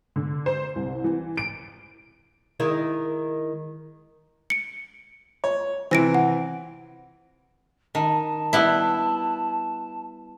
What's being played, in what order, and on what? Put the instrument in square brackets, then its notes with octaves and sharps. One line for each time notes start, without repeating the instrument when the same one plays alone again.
[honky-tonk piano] D3
C5
C2
E3
D7
[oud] D#3 G#3 E4
[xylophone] C#7 D7
[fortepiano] C#5
[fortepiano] C3 E3 [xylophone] C5 A#6 D7
[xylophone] F#5
[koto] D#3 [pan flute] A5
[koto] G3 B3 E4